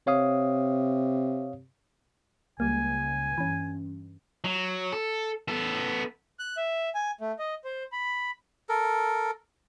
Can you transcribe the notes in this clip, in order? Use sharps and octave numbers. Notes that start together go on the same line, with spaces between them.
C3 C#5 F5 D#6
C#2 G3 A#3 G#5
G2 E3 C#4
F#3
A4
B3 A4
F#6
E5
G#5
A3
D#5
C5
B5
A4 A#4